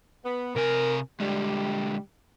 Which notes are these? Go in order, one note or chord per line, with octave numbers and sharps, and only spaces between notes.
B3
C3 C4 A#4 G#5
D3 G3 G#3